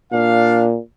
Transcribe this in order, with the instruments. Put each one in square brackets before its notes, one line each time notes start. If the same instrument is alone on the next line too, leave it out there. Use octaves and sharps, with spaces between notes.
[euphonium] A#2 [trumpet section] D4 F5